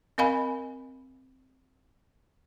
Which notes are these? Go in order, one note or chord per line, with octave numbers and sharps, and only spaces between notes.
C4 A#4 D#5 F5 G#5 B5